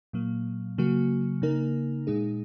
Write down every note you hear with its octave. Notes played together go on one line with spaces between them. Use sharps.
A#2 F#3 A#3
C#3 F#3 A#3 F#4
C#3 A#3 D#4 A#4
A#2 G#3 D#4 G#4